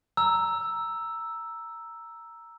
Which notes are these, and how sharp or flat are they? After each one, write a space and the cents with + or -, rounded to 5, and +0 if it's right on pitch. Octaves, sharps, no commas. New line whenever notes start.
A#5 +0 E6 +0